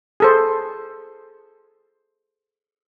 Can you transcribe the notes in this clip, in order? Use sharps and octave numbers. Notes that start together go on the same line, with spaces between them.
G#4 A4 C5